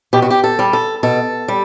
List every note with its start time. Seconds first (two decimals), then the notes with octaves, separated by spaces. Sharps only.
0.13 B2 G4
0.22 F#4
0.30 G4
0.44 A4
0.59 G3
0.73 A4
1.03 B2 A4
1.48 G3